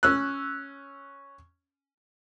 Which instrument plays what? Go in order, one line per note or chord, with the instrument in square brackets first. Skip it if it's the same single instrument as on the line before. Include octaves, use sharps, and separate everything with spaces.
[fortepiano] C#4 E6 F#6